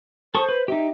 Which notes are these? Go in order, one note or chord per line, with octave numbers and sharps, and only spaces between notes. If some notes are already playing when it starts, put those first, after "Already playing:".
A4 C5 C#6 D#6
B4
D#4 G4 E5